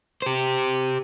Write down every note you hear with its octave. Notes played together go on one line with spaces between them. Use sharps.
G4 C5